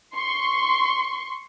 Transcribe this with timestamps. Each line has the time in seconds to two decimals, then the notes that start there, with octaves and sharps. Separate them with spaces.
0.16 C6 C#6